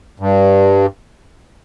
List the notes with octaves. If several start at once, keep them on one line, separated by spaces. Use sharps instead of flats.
G2